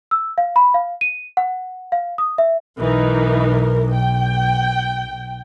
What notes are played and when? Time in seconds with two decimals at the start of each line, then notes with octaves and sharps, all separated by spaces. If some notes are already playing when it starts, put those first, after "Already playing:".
0.11 E6
0.38 F5
0.56 B5
0.74 F5
1.01 D#7
1.37 F#5
1.92 F5
2.18 D#6
2.38 E5
2.79 B1 E3 D#4 A#4
3.93 G5